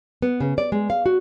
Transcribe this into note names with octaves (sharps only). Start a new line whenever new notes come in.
B3
C#3
D5
G#3
F5
F#4